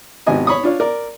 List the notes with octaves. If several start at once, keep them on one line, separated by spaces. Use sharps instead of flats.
G#1 C3 B3 D#5 G#5
C#5 B5 C#6 D#6
D4 F4 C#5
A#4 D5